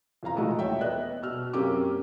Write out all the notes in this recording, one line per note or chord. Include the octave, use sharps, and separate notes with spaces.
F2 E3 F5 A#5
A#2 E3 G#3 A3 D#4 F#4
D#1 C#5 E5 G5
B3 B4 D5 D#5 F#6
B2 E6 F6
F#2 A#3 C4 C#4 G4 D6